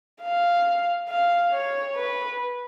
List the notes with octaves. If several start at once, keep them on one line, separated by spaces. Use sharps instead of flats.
F5
F5
C#5
B4